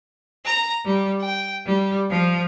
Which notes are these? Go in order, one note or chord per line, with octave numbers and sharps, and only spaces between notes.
A#5
G3
G5
G3
F3